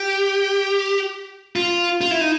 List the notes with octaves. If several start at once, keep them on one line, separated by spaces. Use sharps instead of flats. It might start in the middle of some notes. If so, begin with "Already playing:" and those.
Already playing: G4
F4
F4
E4
D#4